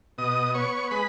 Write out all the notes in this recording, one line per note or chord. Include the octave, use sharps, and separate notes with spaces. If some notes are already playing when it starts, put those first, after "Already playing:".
B2 D#5 D#6
B3 C#5 C#6
G#3 B4 B5